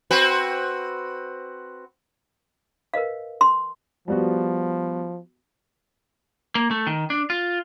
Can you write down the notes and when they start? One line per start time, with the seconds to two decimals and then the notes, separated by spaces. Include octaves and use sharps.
0.11 C4 F#4 B4
2.94 A#4 B4 D#5 F5
3.41 C6
4.08 F3 G3 B3 F#4
6.55 A#3
6.71 A3
6.87 D#3
7.10 D4
7.30 F4